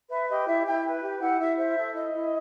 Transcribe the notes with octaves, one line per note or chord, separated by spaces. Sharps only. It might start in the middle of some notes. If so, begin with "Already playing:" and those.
B4 E5
G4 D#5
E4 E5
E4 G5
B4
G4
E4 F#5
E4 E5
C5 E5
A4
E4 D#5
E4